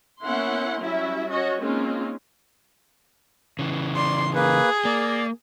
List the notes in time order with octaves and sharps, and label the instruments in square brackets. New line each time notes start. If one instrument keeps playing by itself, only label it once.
[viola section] A#3 B3 C#4 E4 F#5 C6
F#3 G3 C#4 E4 E5
C#4 F#4 C#5 D#5
G#3 A#3 C4 C#4 D#4 F4
[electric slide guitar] C#3 E3
[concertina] D5 [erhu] C6
[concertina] A#3 B4 [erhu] G#4
[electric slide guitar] A#3 [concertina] D5